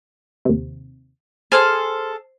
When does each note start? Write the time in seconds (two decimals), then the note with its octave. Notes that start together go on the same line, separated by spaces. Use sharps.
0.45 D#2 C3
1.52 G#4 A4 C5 G#5 A5 F6